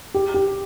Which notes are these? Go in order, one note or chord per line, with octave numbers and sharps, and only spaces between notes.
G4
G4